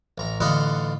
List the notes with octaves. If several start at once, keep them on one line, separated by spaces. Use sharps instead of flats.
A1 A#5
A1 D3 F4 D#5 F#5 B5